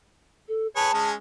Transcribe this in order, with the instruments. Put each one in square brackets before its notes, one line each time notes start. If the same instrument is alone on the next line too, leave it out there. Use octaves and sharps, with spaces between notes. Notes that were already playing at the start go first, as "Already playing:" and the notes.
[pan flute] A4
[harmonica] G#4 B4 C#5 [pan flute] A5
[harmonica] G#3 C#4 G#4